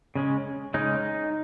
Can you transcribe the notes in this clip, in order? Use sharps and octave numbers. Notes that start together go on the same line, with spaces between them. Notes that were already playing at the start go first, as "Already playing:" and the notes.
C#3 G#3 C#4
C#3 G#3 C#4 D#4